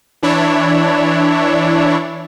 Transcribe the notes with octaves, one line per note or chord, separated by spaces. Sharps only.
E3 D4 E4 C#5